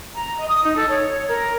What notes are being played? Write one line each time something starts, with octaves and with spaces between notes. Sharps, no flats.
A#5
D#5
D#6
D#4
A4
C#5
A#4